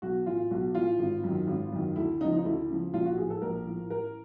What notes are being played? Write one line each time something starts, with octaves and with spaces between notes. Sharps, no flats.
B1 F#4
A2 E3 F4
B1 F#4
A2 E3 F4
G#1
F#2 D#3
G#1
F#2 D#3
D2 E4
C#3 F3 D#4
D#4
D2 E4
C#3 F3
A#1 F4
F#4
A2 F3 G#4
A4
A#1 A#4
A2 F3
A1 A#4